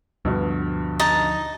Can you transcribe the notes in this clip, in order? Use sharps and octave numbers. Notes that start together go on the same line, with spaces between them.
D2 G2 B2 D3 F3
D#4 D#5 A5